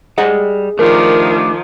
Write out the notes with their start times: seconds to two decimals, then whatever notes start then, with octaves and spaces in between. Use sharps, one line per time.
0.18 G3 G#4 D#5 F#5
0.79 D#3 F3 A3 D4 G4 A#4